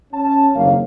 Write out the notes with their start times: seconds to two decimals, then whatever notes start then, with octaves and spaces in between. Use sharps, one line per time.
0.13 C#4 A5
0.55 F#1 D#2 C3 F#3 A#3 F5